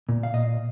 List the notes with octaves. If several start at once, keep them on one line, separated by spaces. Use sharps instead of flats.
A#2
F5
A#2 D#5